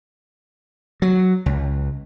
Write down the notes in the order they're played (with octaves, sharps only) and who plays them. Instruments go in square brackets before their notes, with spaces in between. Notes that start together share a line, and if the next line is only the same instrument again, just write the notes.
[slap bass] F#3
C#2